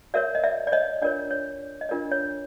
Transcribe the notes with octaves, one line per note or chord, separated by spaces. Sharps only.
F#4 A#4 C#5 D5 E5
D#5
D5 E5
D5
C#5 D#5
D4 F4 A#4 C#5 D5
C#5
D#5
D4 F4 A#4 C#5 D5
C#5